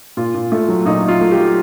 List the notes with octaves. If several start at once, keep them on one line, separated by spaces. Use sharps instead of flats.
A#2 F4
A#2
A3
F#3
A#2 D#4
A#2
F4
A3
G4
F#3